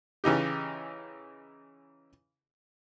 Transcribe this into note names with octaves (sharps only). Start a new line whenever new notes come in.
C#3 E3 D#4 G4